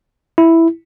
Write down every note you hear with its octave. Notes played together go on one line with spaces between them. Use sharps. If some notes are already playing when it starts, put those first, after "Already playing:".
E4